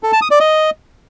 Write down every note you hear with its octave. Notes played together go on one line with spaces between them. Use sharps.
A4
A5
D#6
D5
D#5